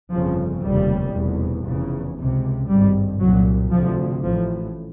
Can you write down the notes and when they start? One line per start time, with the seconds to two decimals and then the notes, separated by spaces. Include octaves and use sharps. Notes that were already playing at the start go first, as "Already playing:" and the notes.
0.12 G1 F2 C#3 F3
0.63 F1 D#2 C#3 G3
1.14 F1 E2 B2
1.66 F1 E2 C#3
2.18 C#2 C3
2.68 G#1 G2 G3
3.20 C2 A#2 F#3
3.71 D2 C3 F3
4.22 A1 A2 F3